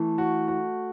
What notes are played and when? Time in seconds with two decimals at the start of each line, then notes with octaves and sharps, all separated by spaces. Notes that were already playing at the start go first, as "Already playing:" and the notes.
Already playing: E3 A3
0.18 F#4
0.48 F#4